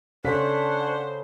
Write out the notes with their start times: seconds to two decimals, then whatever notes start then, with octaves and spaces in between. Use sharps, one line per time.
0.25 C#3 D4 A4 C5 C#5 F#5 B6